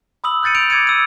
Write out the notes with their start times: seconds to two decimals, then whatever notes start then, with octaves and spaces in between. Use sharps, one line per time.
0.24 B5 D#6 E6 F#7
0.43 F#6 G6 A6 C#7 D#7
0.55 E6 G6 D7 F7
0.70 D6 E6 G#6 A6 C#7 D#7
0.87 E6 D#7